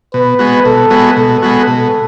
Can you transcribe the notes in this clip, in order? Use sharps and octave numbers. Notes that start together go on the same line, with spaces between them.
B2 B4
G#3 B3 F#4
B2 A4
G#3 B3 F#4
B2 A4
G#3 B3 F#4
B2 A4